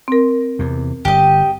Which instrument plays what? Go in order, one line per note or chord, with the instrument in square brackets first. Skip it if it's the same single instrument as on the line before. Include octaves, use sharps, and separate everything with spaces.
[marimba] C4 A#4
[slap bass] E2 C3
[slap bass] G1 [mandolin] G4 D#5